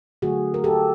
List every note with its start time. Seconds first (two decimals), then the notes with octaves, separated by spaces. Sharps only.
0.22 D3 F#3 A3 F#4 G#4
0.54 A#4
0.64 G4 A4